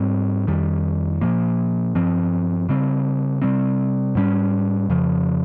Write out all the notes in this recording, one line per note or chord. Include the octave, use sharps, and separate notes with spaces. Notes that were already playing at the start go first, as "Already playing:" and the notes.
Already playing: G#2 G3 C4
F2 D#3 G3
A#2 F3 A#3
G2 F3 C4
C#3 G3 C4
C3 G3 C4
G#2 G3 C#4
F2 C#3 F3